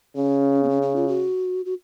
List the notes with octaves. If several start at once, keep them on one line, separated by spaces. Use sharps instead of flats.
C#3 C#4
B3
C#4
C#4
F4
F#4
F#4